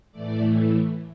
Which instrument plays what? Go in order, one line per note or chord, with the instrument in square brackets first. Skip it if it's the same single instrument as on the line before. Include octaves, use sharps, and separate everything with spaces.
[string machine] A2 E3 A3 D5